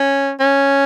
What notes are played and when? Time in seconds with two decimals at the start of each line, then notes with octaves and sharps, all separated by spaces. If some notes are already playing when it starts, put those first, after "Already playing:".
Already playing: C#4
0.40 C#4